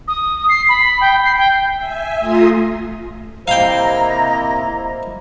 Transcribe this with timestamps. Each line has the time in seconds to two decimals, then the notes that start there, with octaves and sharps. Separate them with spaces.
0.08 D#6
0.49 C7
0.69 B5
1.01 G5
1.24 C7
1.37 G5
1.75 E5 G#5
2.19 A3 F4 A#5 C6 D#6
3.48 C3 A#3 E4 C5 D#5 F5 G5 A#5